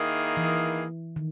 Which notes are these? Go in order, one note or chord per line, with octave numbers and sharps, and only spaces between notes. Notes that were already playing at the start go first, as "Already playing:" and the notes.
Already playing: D#3 A#3 E4 G#4
E3
D#3